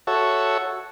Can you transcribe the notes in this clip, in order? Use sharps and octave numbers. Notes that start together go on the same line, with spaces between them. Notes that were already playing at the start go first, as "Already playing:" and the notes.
F#4 A4 C#5 E5